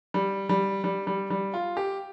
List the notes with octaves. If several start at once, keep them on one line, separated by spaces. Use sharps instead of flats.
G3
G3
G3
G3
G3
F4
G4